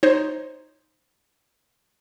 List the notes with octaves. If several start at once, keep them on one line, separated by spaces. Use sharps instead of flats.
D#4 C5 C#5